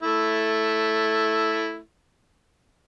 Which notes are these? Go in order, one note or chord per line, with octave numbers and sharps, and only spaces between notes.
A3 E4